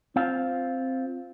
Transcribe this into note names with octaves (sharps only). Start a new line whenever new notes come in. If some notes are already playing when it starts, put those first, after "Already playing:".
C4 F4 F5